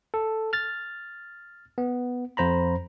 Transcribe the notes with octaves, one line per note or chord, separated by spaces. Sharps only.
A4
F6 A6
B3
F2 C5 A#5 B5